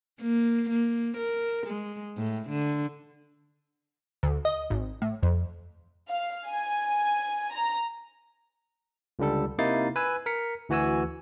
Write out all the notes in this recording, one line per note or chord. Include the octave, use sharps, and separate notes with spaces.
A#3
A#3
A#4
G#3
A2
D3
D2
D#5
G#1
A2
F2
F5
G#5
A#5
C#2 D3 G3 A4
C3 A#3 D#4 E4 A6 C7
B4 G#5 E6
A#4 B6 C#7
D2 E3 F#4 G#5 E6